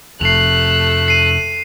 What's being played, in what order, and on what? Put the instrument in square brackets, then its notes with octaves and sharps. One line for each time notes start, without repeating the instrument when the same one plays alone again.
[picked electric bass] F1 F3 [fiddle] A3 F#6 [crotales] C7 F7
[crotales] C7 D#7